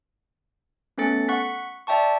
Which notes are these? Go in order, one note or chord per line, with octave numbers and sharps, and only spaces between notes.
A3 B3 C#4 A4 A6 C#7
F#5 C#6 F#6 B6
D5 E5 G5 A5 C#6